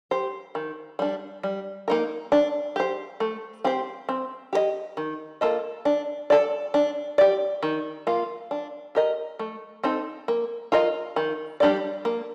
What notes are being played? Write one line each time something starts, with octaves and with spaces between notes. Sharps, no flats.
G4 C5
D#3
G3 D4
G3
A#3 D#4 A#4
D4
G4 C5
A3
C4 G4 C5
C4
G4 A#4 D#5
D#3
A#3 F4 A4 D#5
D4
A4 D5
D4
G4 D5
D#3
A#3 F4
D4
G4 A#4 D#5
A3
C4 D#4 A4
A#3
F4 A#4 D#5
D#3
G3 D4 G4 D5
A#3